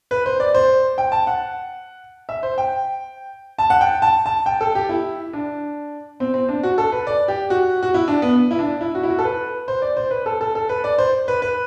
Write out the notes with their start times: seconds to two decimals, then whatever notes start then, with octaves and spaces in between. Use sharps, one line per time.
0.11 B4
0.26 C5
0.40 D5
0.55 C5
0.98 G5
1.12 A5
1.27 F#5
2.29 E5
2.43 C5
2.58 G5
3.58 A5
3.70 F#5
3.81 G5
4.02 A5
4.26 A5
4.46 G5
4.61 A4
4.75 G4
4.89 E4
5.33 D4
6.20 C4
6.34 C4
6.49 D4
6.63 F#4
6.78 A4
6.92 B4
7.07 D5
7.28 G4
7.50 F#4
7.83 F#4
7.94 E4
8.08 D4
8.22 B3
8.51 E4
8.59 D4
8.81 E4
8.95 F#4
9.03 E4
9.10 F#4
9.19 A4
9.24 B4
9.68 C5
9.82 D5
9.97 C5
10.11 B4
10.26 A4
10.41 A4
10.55 A4
10.69 B4
10.84 D5
10.98 C5
11.28 B4
11.42 B4